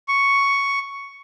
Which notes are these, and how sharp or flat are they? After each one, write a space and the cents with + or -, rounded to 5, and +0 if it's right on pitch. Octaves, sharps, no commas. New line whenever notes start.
C#6 +5